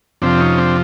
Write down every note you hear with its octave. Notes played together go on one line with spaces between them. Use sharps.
F2 C3 F3 C4 D4
C#4 D#4
C4 D4